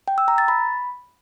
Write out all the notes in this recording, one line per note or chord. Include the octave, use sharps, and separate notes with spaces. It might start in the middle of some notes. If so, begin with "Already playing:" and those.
G5
E6
A#5
A6
B5